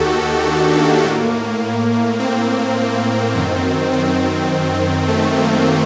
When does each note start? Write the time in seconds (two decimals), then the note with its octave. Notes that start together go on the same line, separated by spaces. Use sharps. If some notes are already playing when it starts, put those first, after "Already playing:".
Already playing: D#2 D#3 F#4 G4 A4
0.47 D4
0.76 A#3
1.04 A2
2.20 C4
3.35 F#2 D#3
3.93 C4
5.08 A3
5.36 A#3